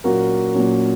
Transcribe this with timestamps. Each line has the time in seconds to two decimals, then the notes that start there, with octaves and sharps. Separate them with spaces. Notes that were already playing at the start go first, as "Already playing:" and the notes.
0.04 A#2 F#3 A#3 C#4 F#4 A#4
0.54 A#2 F#3 C#4